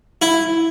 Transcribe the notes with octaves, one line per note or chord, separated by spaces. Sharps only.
E4